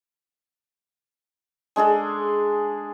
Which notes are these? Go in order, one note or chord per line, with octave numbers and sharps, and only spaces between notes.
G#3 D4 G#4 A4